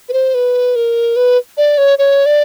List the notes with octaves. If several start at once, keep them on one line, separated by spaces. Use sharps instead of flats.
B4
C5
B4
A#4
B4
D5
C#5
C#5
D5